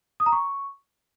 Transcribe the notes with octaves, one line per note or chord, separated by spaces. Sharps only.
D#6
A#5
C#6